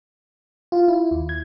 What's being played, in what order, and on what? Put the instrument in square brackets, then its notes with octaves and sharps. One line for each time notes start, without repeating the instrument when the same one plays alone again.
[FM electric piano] F4
E4
D#2
G#6